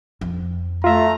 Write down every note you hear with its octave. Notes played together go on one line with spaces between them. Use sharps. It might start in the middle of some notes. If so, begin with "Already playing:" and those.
F2
A3 F4 E5 A#5